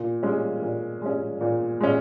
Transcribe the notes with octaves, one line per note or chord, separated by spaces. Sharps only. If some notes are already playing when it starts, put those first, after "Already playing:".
Already playing: A#2
G#3 C#4
A#2
G#3 C#4
A#2
G#3 C#4